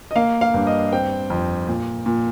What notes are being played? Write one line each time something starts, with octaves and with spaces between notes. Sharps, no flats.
D#5
A#3 F5
F5
G2
D#5
C4 G5
F2
A#2
A#2